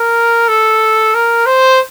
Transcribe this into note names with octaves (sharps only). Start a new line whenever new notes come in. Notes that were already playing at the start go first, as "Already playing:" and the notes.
Already playing: A#4
A4
A#4
C5